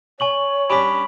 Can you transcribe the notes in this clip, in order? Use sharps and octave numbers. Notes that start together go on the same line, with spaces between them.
C#5 G#5 C#6 F#7
G3 C#4 D4 B5 B6